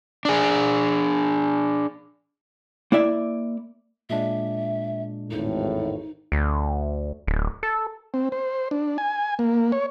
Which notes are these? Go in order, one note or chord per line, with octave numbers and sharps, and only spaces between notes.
D4 G#4
A#3 E4 D5 E5
A#2 G#3 D4 E5
G#1 E2 A2 D#4
D2
D1
A4
C4
C5
D4
G#5
A#3
C#5